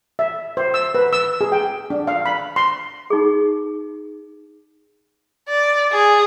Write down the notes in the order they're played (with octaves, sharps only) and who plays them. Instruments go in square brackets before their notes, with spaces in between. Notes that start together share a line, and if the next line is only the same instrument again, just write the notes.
[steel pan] E5
C5
E6
B4
E6
G#4
G5
D4
F5
B5
C6
[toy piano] D#4 G#4
[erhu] D5
G#4